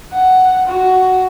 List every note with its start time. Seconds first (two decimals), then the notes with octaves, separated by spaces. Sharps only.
0.13 F#5
0.67 F#4